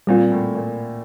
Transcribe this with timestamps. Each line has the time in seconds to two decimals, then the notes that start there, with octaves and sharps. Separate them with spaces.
0.07 A#2 G3 C4 F4
0.32 A2
0.55 A#2